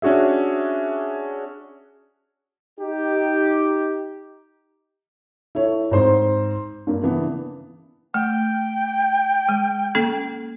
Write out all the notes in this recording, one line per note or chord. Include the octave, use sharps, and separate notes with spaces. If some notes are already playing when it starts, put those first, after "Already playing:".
C#4 D4 F#4 G#4 E5
D#4 G4
E4 A4 C#5
G#2 C4 C5 C6
G2 A#3
C#3 E3 B3 D4
A3 G5
G#3
A#3 C#4 A4